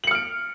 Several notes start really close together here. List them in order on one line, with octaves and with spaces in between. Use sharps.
F#7 C#7 F6 D7